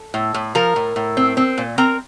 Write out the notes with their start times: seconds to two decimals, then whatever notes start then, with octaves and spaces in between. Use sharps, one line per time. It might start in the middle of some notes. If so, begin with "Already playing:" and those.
Already playing: A4
0.14 A2
0.34 A2
0.55 F3 A#4 A#5
0.76 A2
0.96 A2
1.17 C4
1.37 C4
1.58 A#2
1.78 C4 A#4 A#5